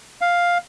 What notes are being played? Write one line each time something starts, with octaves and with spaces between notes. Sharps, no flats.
F5